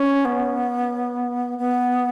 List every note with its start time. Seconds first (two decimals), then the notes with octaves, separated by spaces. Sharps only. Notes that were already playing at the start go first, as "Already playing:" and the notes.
Already playing: C#4
0.25 B3
1.58 B3